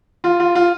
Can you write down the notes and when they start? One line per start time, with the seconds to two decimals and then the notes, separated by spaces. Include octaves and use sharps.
0.24 F4
0.40 F4
0.55 F4